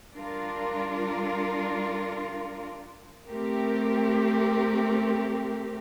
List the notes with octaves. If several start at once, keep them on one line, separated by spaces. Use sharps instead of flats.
G3 D4 F4 A#4
A3 C4 G4 A#4